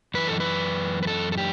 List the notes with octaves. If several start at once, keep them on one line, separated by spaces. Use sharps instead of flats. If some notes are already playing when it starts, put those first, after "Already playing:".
F#2 E3 B4
A4
B4
B4
A4
A4
G4